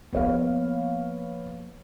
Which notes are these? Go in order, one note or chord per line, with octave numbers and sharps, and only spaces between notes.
F3 A#3 B3 C#5 F5